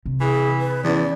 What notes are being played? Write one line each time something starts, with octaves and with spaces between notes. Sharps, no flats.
C3
E3 G#4
B4
E2 E3 C#4 D5